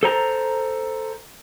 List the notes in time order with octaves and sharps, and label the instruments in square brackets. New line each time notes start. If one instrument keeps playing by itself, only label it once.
[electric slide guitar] A4 C5 A#5